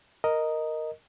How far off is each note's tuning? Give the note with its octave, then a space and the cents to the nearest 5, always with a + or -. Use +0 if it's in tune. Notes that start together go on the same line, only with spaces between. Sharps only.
A#4 +0 D#5 +0